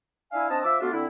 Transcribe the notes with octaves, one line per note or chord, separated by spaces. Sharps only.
D4 E4 E5 F5 G#5
C4 D4 D#5 A5
F3 E5 D6 E6
A3 B3 D4 F4 F#4
D3 C4 E4